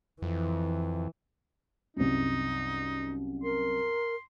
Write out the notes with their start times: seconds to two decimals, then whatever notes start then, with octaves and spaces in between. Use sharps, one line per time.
0.22 F2 E3
1.97 C2 F#2 D#4
3.44 A#4 C6